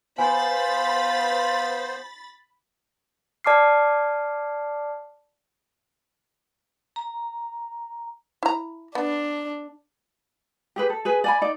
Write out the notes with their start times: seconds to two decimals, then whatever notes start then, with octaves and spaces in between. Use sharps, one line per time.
0.18 B3 F4 C5 G#5 B5 A6
3.44 D5 A5 D6 F6 C7
6.96 A#5
8.43 E4 A#5
8.95 B3 D4
10.76 G4 G#4 B4
10.90 A4
11.05 G#4 B4 G#5
11.24 D5 G#5 B5
11.41 D#4 D5